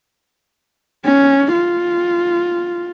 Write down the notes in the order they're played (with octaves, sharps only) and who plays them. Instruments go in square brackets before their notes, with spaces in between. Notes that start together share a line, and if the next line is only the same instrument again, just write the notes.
[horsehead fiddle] C#4
F4